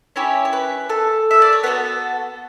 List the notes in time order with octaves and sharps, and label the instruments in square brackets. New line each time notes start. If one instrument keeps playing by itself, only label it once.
[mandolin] C#4 E4 G4 C#5
C#5
B4
A4
E5
D5
C#5
B3 F#4 A4 B4